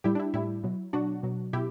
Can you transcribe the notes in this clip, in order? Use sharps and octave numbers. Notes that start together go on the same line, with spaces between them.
A2 G3 E4 G4
D4
E4
A2 G3 E4
B2 F#3
B2 F#3 D4 F#4
B2 F#3
B2 E4 G4